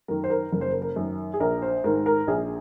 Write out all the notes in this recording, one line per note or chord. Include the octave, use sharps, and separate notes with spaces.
F#2 D#3 A#4
C5
A#4
F#1 A#4
C5
A#4
A#4
F#2 D#3
G#4
A#1 A#4
C5
G#2 D#3 A#4
A#4
A#1 G#4